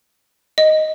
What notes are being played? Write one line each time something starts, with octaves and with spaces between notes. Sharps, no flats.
D#5